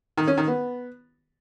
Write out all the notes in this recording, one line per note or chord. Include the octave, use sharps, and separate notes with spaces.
D#3
C#4
D#3
B3